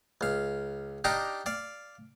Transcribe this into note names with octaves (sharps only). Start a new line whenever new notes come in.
C#2 F5
D4 D#4 G4 F5 A#5 D6
D5 F5